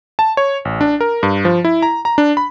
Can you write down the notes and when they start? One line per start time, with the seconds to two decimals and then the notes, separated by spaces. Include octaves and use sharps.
0.19 A5
0.37 C#5
0.65 A1
0.81 D4
1.01 A#4
1.23 G2
1.45 F3
1.65 E4
1.82 A#5
2.05 A#5
2.18 D4
2.37 B5